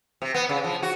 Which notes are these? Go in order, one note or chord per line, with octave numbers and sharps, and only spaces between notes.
C3
B3
C#3
F3
F#4